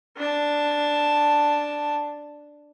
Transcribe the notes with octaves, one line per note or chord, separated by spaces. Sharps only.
D4 A5